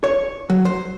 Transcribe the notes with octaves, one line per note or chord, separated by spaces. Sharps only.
C#5
F#3
C5